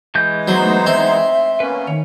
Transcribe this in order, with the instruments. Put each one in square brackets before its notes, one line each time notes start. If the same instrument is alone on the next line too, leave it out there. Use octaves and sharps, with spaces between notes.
[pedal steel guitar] E3 G#3 G6
[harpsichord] F#3 [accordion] B3 D#4 C5
[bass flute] A3
[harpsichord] C4 [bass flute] E5
[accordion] A#3 B3 C#4 [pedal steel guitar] B4
[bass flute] D#3 [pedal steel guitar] C#5